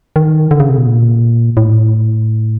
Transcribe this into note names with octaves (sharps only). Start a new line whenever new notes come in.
D#3
D3
C#3
C3
B2
A#2
A2